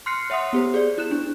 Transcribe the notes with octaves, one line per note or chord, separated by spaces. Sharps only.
C6 F6 F#6 C7 C#7
C#5 E5 F#5 C6 D#6
B3 G4 C5
G#4 D5
E4 F#6 E7
D4